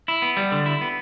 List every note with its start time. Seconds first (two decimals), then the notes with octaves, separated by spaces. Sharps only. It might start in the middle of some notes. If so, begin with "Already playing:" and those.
0.08 E4
0.22 B3
0.37 G3
0.52 D3
0.66 E4
0.81 B3